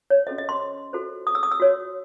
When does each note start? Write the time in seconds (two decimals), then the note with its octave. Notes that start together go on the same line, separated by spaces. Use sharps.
0.10 C#5
0.27 C#4 F#4 A4 C5 D#5
0.38 D#5
0.49 C6
0.93 F#4 A4 C5
1.27 D#6
1.35 E6
1.43 D#6
1.52 E6
1.60 F#4 C#5